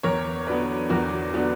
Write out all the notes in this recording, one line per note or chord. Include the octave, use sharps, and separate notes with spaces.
E2 A#4 C#5
D3 F#3 B3 B4 D5
E2 F#4 A#4
D3 F#3 B3